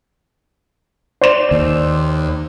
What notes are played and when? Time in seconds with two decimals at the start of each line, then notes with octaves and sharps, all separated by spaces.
1.21 C5 D5 E7
1.51 D#2